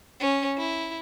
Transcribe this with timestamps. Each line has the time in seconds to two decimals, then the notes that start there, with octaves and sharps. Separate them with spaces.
0.20 C#4
0.58 E4